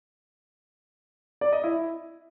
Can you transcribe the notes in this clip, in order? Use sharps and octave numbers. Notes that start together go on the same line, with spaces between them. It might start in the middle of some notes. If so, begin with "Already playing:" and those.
D5
D#5
E4